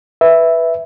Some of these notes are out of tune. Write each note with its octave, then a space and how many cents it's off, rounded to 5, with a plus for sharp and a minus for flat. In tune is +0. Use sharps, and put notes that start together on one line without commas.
B4 +0 E5 +0